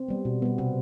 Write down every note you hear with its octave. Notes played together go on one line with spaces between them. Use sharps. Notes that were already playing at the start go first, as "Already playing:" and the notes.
Already playing: C4
G3 B3
B2
G3 B3
C3 C4